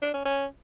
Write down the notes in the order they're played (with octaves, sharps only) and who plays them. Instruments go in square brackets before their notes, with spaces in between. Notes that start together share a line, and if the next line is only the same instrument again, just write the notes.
[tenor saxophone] D4
C#4
C#4